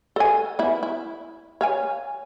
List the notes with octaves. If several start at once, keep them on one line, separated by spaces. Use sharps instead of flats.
A4 D#5 G#5
B3 E4
E4
C#5 F5 G#5